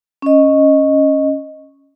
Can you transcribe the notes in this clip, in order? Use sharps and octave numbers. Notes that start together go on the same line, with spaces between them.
C#4 D#5